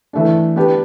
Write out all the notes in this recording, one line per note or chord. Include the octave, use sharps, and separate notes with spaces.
E3 A3 D4
B3 D4 G4 B4